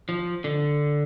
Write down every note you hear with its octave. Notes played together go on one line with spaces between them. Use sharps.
F3
D3